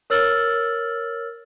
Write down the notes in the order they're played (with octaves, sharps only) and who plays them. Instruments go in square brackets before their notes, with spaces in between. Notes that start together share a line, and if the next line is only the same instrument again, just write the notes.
[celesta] A#4 C#5 E6 F6 A6 F#7